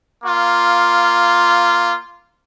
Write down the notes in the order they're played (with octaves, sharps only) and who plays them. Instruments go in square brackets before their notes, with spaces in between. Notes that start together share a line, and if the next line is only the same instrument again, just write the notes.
[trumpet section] A#3 F4